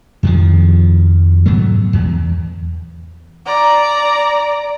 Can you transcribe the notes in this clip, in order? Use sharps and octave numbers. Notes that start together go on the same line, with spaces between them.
F2 D#3 F3
G#2 B2 F#3 A3
E2
D5 A#5